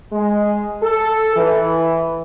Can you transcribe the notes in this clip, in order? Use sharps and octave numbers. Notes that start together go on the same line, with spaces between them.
G#3
A4
E3